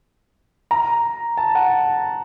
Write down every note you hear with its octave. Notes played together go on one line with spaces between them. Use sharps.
A#5
A5
F#5